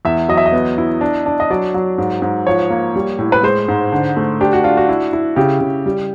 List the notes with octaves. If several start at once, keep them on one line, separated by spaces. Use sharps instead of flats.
E2 E5
F#3 D#5
E5
D#5
B3
E4
D4
D4
D#5
F#3 D5
F#3
G#2
G#2
F3 C#5
A#3
G3
A2
B4
G#3 C5
G#2
D3
A3
D4 G4
F#4
D4 F4
F#4
E4
E4
C#3 G4
C#3
G3